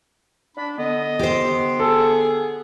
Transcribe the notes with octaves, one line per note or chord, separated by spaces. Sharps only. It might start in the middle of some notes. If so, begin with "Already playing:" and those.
D4 B5
D3 B3 D#5
G4 C5
G#4 A4